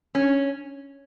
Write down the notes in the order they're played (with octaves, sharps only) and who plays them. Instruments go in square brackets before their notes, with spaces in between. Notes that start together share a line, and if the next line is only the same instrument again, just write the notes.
[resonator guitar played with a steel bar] C#4